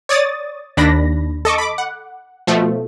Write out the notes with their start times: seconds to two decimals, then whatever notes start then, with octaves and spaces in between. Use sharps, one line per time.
0.09 C#5 D5 D#6 A6
0.77 D#2 D4 B5 A#6
1.45 A4 D#5 C#6 D6
1.58 B5 D6
1.78 F#5
2.47 B2 F3 A3